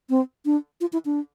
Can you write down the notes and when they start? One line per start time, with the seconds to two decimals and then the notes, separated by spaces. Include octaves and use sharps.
0.10 C4
0.45 D4
0.81 F4
0.93 E4
1.05 D4